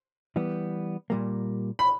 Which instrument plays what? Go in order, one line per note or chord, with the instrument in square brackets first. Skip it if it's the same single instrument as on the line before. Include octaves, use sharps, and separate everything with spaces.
[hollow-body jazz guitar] E3 G3 B3
A#2 G3 A#3
[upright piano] B5